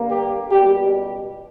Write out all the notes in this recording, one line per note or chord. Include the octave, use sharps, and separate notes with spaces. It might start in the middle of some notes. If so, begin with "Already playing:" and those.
Already playing: G2 D3 A#3
G4
C#2 B2 G3 G4